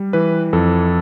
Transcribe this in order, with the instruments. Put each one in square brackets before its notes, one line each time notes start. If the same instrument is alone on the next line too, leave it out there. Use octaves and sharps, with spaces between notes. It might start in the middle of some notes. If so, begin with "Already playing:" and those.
Already playing: [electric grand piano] G3
E3 B4
F2 A4